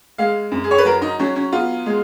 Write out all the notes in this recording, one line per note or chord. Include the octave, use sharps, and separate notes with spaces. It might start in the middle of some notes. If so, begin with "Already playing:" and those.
G#3 F5
F#2
G#4
C#5
B4
F#3 A#4
D#4
F#3 C#4
C#4
B3 F4
G#3